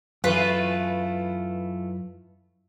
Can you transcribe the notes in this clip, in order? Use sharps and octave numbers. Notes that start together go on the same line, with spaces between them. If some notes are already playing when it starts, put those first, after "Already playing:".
F#2 E3 A3 F4 B4